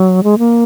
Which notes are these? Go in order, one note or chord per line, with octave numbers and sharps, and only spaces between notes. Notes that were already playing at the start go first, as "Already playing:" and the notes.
Already playing: F#3
G#3
A#3